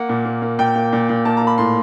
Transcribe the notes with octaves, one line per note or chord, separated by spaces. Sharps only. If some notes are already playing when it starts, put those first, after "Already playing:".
Already playing: A#3 F#5
A#2
A#3
A#3
A#2 G5
A#3
A#2
A#2
A#3 A5
A#3 A#5
B5
A2 C6